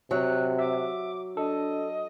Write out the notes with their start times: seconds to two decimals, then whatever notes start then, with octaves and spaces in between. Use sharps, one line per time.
0.11 C3 F#3 F#6
0.59 E5 D6
1.37 D4 A4 D#5